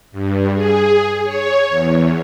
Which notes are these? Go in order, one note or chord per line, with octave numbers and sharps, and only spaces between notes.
G2
G#4
C#5
E2